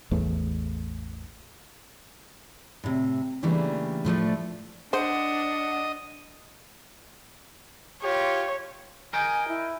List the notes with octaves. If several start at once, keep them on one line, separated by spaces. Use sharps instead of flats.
A1 E2 A3
A2 C3
C#3 E3 G3 A3 A#3 D4
A2 F3 A3 D4
D4 C5 D#5 F#5
F4 G4 C#5
A#4 D#5 G5 G#5
E4